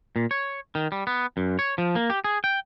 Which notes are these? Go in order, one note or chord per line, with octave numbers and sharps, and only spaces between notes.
A#2
C#5
D#3
G3
B3
F#2
C#5
F3
A#3
G4
G#4
G5